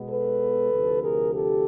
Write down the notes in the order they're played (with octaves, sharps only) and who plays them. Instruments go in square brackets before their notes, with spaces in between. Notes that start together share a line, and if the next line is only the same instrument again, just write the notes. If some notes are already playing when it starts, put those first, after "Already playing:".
Already playing: [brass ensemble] B2 G#3 B3
A4 B4
D2 C3 F3
G#4 A#4
G4 A4